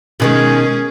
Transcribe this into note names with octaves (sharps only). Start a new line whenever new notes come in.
B2 D#3 G#3 C#4 G#4